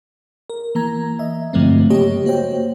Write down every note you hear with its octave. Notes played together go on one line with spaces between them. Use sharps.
A#4
E3 A#3 A#5 G#6
D#5 E5
G2 D3 F3 F#3 A3 C4
C#3 A#3 G4 C#5 D#5
A#3 F#4 C5 C#5 G5